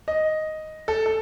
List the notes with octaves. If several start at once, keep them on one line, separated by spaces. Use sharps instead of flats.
D#5
A4
A4